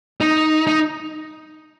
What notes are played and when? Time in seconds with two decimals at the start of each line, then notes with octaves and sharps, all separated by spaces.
0.21 D#4
0.67 D#4